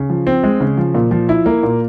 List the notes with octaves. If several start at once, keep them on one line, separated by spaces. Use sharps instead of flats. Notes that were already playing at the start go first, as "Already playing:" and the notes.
Already playing: C#3
F3
C4
G#3
C#3
F3
A#2
F3
E4
A#3
A#2